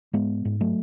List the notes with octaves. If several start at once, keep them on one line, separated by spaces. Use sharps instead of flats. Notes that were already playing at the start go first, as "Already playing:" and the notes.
G#2 G#3 B3
G#2
F#3 A3